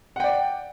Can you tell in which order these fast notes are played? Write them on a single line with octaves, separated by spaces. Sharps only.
F#5 G5 D5